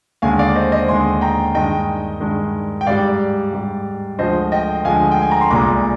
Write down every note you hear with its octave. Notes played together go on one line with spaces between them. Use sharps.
D#2 D3 G#3 F5 G#5
D5 F5
C5 D#5
C5 D#5
D#2 D3 G#3 G#5 C6
G5 A#5
G2 D#3 G#3 D#5 G5
G2 D#3 G#3
G5
G#2 G3 D5 F5
G#2 G3
D2 D3 F3 G#3 C5 D#5
D#5 G5
D2 D3 F3 G#3 F5 G#5
G5
G#5
A#5
C6
C2 A#2 G#3 A#5 D6